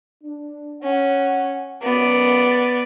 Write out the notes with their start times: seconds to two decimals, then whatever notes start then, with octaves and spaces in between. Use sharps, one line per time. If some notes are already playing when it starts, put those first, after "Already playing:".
0.24 D4
0.83 C#4 F#5
1.83 C#2 F#2 B3 D5